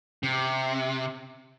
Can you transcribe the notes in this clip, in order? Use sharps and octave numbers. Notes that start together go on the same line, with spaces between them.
C3